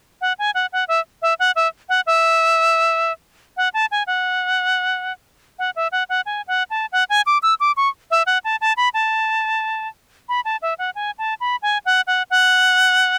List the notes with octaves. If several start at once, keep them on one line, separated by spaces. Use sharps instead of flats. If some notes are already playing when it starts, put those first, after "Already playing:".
F#5
G#5
F#5
F#5
E5
E5
F#5
E5
F#5
E5
F#5
A5
G#5
F#5
F#5
E5
F#5
F#5
G#5
F#5
A5
F#5
G#5
D6
E6
D6
C#6
E5
F#5
A5
A5
B5
A5
B5
A5
E5
F#5
G#5
A5
B5
G#5
F#5
F#5
F#5